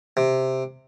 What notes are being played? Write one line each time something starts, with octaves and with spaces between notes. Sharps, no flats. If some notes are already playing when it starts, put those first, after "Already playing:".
C3